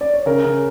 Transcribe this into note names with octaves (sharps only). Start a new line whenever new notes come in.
D5
C#5
C#3 A#4
C#3